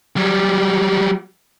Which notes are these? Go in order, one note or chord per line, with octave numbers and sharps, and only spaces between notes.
F#3 G3